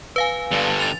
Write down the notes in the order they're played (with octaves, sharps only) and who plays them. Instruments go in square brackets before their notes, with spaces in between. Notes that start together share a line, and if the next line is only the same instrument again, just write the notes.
[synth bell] B4 F5 G#5
[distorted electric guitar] G2 D3
[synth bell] A6 F7